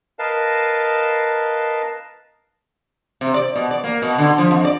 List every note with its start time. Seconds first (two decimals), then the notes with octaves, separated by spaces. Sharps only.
0.19 A#4 B4 D#5 F5 A5
3.21 C3
3.34 D5
3.56 B2
3.71 D5
3.84 A#3
4.02 B2
4.18 D3
4.38 F3
4.51 F2
4.65 D5